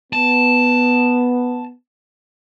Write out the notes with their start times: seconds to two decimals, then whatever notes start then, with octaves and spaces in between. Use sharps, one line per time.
0.13 B3 A5